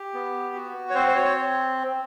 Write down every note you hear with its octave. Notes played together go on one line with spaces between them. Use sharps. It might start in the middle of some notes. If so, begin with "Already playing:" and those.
Already playing: G4
B3
F#4
C#5
C4 C5
C5
C#5